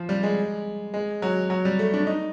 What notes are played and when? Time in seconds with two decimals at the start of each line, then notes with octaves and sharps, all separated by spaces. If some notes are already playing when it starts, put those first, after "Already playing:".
Already playing: F3
0.09 G3
0.23 G#3
0.94 G#3
1.22 F#3
1.50 F#3
1.65 G3
1.79 A3
1.94 D4
2.07 D#4